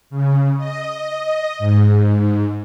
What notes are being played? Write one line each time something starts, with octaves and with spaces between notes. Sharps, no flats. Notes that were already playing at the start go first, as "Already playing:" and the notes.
C#3
D#5
G#2